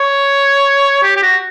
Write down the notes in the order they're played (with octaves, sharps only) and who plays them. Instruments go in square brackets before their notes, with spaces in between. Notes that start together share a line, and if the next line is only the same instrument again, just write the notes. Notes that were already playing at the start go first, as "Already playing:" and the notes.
Already playing: [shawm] C#5
G4
G4
F#4